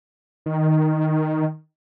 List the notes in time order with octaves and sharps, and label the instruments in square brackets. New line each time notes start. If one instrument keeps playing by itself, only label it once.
[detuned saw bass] D#3